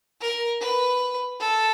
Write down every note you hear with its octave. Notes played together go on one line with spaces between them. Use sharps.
A#4
B4
A4